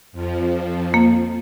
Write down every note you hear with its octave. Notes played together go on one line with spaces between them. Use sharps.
F2 F3
A#3